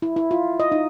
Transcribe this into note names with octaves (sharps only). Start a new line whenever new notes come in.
E4
E4
F4
D#5
D#4